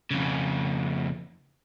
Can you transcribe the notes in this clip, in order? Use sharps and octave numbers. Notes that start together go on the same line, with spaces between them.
F2 C#3